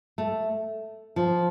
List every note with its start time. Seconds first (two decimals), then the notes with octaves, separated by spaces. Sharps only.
0.18 A3
1.16 F3